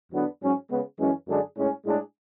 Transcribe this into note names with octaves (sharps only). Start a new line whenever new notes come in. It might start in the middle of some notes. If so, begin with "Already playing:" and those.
E2 D3 F#3 B3 D4
G#2 F#3 C#4
C#3 G#3 B3
F#2 E3 G#3 C#4
F#2 D3 G#3 D4 G#4
A2 G#3 C#4
A2 G#3 D4 G#4